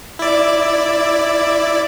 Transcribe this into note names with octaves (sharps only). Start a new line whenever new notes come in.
E4 D5